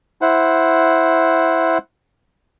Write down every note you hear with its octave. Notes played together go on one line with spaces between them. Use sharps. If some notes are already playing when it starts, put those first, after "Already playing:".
E4 C5 F#5